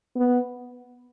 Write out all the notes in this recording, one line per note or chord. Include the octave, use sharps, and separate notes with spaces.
B3